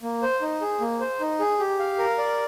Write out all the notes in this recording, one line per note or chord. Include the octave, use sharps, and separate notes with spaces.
A#3
C5
D#4
G#4
A#3
C5
D#4
G#4
G4
F5
A#4
D5